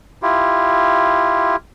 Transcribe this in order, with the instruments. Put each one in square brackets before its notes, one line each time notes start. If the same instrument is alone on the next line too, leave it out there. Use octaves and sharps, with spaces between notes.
[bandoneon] E4 F4 G4